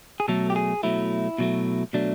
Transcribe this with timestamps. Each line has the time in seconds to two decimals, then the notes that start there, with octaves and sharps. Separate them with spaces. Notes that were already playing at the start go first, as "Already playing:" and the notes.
0.20 G#4
0.28 B2 F#3 A3 A4
0.50 G4
0.56 G#4
0.83 B2 F#3 A3 E4
1.38 B2 F#3 A3
1.93 B2 F#3 A3 D4